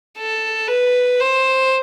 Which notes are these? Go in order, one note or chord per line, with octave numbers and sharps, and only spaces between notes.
A4
B4
C5